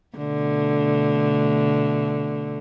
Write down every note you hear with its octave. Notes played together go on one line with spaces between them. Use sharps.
B2 D3 A3